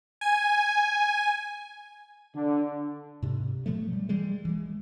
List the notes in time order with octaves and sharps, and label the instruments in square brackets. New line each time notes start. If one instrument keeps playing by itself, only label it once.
[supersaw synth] G#5
[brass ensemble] D3
[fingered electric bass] G#2 C3
B2 F3 F#3 A3
G3
E3 G3 G#3
E3 G#3